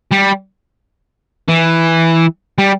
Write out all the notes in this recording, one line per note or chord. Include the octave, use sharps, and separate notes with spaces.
G3
E3
G3